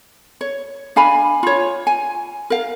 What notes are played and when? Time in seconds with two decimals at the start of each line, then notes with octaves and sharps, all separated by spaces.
0.41 C#5
0.96 D4 F5 G#5 B5
1.43 F4 C#5
1.87 G#5
2.50 A#4 F5